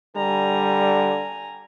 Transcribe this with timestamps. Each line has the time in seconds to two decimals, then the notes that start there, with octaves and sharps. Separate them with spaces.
0.16 D3 G3 G#5 A#5